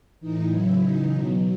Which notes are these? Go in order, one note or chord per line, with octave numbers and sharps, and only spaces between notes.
A2 E3 D#4
C#3 F#3 E4
C#3 E3 D#4
B2 F#3